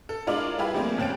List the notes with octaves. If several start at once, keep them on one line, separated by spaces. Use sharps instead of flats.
A4
G#3 D4 E4 F4 A#4 C#5
G3 E4 G4 G#4 B4
F3 G3 A3 A#3 C4 G#4
D#2 C4 C#4 A6 D7